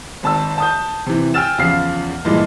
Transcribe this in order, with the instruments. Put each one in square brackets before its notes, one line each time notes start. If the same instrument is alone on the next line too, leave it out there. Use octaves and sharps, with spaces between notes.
[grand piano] G#1 A5 E6
A5 D#6 G6
C3 E3
G5 G#5 E6 F6 A6 E7
E2 C#3 F3 F4 F6 C7
G2 A#2 E3 G#3